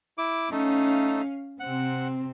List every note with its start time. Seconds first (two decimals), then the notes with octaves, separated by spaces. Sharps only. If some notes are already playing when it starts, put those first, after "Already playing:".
0.18 E4 D6
0.52 A3 C#4 D#4 F5
1.60 C3 C4 F#5